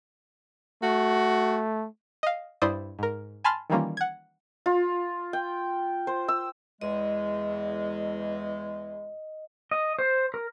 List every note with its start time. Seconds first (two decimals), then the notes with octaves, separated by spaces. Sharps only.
0.83 A3 F#4
2.23 D#5 F5
2.62 G2 E4 C5 D5 D#6
2.99 G#2 A#4
3.44 G#5 A5 B5 C6 F6 A6
3.70 D#3 E3 G3 A#3 C#4 F4
3.97 F#5 G#6
4.66 F4
5.33 G5
6.07 C5
6.28 E6
6.81 E2 G#3 D#5
9.71 D#5
9.99 C5
10.34 A#4